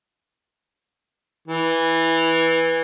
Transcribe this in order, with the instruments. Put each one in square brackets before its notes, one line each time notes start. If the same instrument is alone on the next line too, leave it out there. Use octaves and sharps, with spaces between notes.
[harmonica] E3